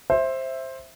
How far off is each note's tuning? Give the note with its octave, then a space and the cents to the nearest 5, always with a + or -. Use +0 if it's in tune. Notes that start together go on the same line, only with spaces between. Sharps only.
C5 +15 E5 +0